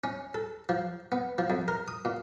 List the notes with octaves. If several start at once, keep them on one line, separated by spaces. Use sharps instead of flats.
C#4
A4
F3
B3
F3
F2
A#4
D#6
A#2